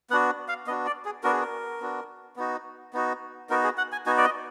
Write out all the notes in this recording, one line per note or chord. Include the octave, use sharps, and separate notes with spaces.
B3 D4 F#4 F#5
F5
B3 D4 F#4 D#5
D5
G#4
B3 D4 F#4 A#4
G#4
A#4
B3 D4 F#4
B3 D#4 F#4
B3 D#4 F#4
B3 D#4 F#4 A#4
G#4
F#5
G#5
B3 D#4 F#4 G#5
D5
D#5